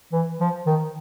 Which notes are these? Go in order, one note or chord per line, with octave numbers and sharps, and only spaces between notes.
E3
F3
D#3